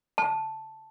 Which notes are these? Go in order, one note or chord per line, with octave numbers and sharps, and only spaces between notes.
A5